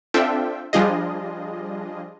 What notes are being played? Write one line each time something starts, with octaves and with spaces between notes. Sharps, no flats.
C4 D4 F4 A4 E5 G5
F3 G3 D4 F4 G#4 D#5